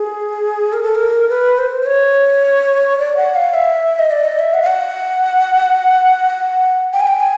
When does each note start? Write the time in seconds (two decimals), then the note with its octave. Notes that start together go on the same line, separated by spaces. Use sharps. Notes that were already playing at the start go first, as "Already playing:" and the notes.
Already playing: G#4
0.73 A#4
0.83 A4
0.95 A#4
1.29 B4
1.58 C5
1.82 C5
1.86 C#5
2.99 D5
3.17 F#5
3.36 F5
3.54 E5
3.99 D#5
4.11 D5
4.25 D#5
4.39 E5
4.54 F#5
4.62 F5
4.67 F#5
6.93 G5
7.00 G#5
7.07 G5
7.20 G#5